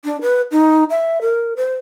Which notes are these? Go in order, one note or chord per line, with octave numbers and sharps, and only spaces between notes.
D4
B4
D#4
E5
A#4
C5